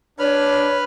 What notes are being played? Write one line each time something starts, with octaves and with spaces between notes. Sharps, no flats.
D4 B4 C#5 B5 F6